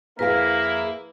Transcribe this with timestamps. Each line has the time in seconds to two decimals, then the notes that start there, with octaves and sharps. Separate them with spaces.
0.19 F2 A#3 E4 G#4 A#4 B4 F5